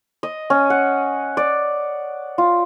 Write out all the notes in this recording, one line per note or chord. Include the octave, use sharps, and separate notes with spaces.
D#5
C#4
F#5
D5
F4